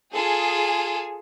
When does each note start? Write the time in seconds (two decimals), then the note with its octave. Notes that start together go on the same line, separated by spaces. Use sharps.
0.14 F4 G#4 A4